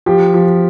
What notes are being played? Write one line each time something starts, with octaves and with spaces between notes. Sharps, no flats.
F3 G4
F3